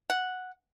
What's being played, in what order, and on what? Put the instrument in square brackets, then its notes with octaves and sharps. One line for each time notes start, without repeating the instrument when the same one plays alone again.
[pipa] F#5